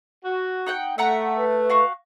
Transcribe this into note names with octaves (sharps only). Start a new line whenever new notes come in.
F#4
D#4 F#5 G5
A3 E5 F#5 A#5
B4
F#4 F5 C#6